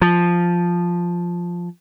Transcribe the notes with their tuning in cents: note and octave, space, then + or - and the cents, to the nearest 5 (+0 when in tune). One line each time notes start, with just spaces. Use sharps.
F3 +0